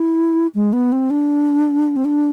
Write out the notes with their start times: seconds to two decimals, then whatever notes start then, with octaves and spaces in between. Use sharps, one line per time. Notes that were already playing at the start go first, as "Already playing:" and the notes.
Already playing: E4
0.55 G#3
0.73 B3
0.92 C4
1.10 D4
1.96 C4
2.05 D4